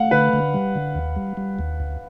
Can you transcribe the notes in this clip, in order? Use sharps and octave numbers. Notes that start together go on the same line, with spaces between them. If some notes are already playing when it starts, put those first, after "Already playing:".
Already playing: A3 F5 F#5
D3 B4
D3
G3
D3
D#2
G3
G3
D#2
D2